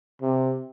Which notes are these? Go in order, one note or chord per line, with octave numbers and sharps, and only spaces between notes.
C3